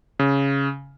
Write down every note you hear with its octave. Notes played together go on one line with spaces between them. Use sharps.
C#3